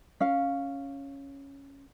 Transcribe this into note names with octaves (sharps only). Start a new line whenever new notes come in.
C#4 F5